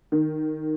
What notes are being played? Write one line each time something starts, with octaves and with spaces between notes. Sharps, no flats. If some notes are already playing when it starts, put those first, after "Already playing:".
D#3